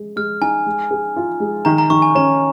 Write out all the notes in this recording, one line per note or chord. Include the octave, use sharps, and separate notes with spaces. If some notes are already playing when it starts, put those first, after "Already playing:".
Already playing: G#3
G#3 F6
D#4 G#5
G#3
G#4
F4
G#3
D#3 A#5
A#5
D#3 C#6
G#5
C#4 A#5